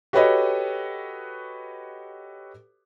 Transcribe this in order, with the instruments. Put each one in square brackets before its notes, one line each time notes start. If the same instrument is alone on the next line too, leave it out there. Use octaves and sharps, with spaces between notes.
[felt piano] F#4 G4 A4 B4 C#5 D#5